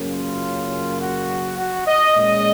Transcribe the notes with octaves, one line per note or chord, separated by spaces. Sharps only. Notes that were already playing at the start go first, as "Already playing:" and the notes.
Already playing: F#2 C#3 F#3 A#3 C#4
F4
F#4
F#4
D#5
A#2 G#3 C#4 D#5